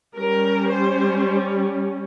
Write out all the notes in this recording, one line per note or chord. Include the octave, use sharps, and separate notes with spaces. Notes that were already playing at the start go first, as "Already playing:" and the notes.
G3 C#4 A#4
C5